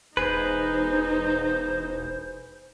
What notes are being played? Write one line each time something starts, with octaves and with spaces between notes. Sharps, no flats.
E1 D#4 G#4 B4 C5